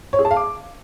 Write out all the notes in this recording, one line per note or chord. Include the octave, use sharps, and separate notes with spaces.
C#5
G#4
A5
F5
D6